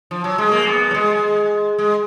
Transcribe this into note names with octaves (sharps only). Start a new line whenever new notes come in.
F3
F#3
G#3
A#3
B3
F#3
G#3
G#3